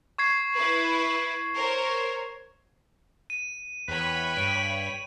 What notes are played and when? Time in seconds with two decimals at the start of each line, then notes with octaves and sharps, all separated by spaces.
0.18 C#6 G#6 C7
0.55 E4 B4
1.55 A#4 C5 C#5
3.30 D#7
3.88 E2 B4 C#5 G5 B5
4.37 G2 D7 D#7